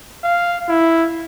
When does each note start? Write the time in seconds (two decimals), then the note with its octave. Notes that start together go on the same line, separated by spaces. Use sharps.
0.24 F5
0.69 E4